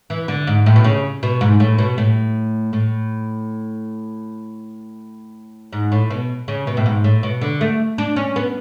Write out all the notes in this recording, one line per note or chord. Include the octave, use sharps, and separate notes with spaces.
E3
D3
G#2
A2
B2
C#3
B2
G#2
A2
B2
A2
A2
G#2
A2
B2
C#3
B2
A2
G#2
A2
B2
D3
A3
D4
C#4
B3